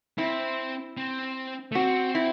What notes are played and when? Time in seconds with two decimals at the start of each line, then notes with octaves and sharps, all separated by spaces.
0.18 C4 E4
0.97 C4
1.72 A3
1.75 C4 F#4
2.15 E4